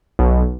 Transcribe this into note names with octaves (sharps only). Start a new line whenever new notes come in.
B1